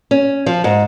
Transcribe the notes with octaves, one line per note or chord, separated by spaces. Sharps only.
C#4
F3
G#2